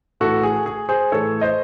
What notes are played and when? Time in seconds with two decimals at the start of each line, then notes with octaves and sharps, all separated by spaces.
0.20 A2 E3 F#4 A4
0.43 G#4
0.66 G#4
0.89 G#4 C5
1.12 A2 E3 A4 C#5
1.41 C5 D#5